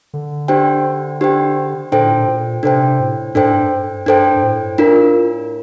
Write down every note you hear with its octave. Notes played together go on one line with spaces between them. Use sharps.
D3
D4 G4 C5 G5
D4 G4 C5 G5
A#2 D4 A4 C5 G5
A2
A#2
A#2
C3 D4 A4 C5 G5
A2
G2 D4 A4 C5 G5
A2
G2
G2 D4 A4 C5 G5
G2
A2
D4 F4 A#4